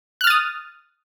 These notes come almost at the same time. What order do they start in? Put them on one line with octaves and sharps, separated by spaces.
F#6 F6 A6 D#6